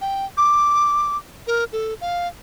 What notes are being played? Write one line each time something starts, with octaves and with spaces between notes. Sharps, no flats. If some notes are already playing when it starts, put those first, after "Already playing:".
G5
D6
A#4
A4
F5